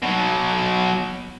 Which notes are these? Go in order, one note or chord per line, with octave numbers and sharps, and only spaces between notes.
B2 F#3